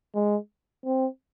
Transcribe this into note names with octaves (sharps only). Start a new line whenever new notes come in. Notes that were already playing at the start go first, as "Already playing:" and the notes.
G#3
C4